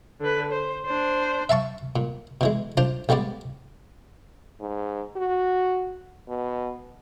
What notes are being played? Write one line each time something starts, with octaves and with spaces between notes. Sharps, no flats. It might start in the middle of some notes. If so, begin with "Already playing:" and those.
D3 B4
C5
D4 C5
E5 F5 A5 C#6
A#2
B2 E3 G#3
D4 F4 C5
A#1 G3 G#3 B3 D5
G#2
F#4
B2